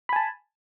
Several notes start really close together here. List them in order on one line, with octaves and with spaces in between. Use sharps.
B5 G#5 A5